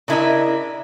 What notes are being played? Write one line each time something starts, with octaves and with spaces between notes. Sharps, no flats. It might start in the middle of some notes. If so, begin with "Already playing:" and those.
C#3 D4 E4 A#4 D#5 E5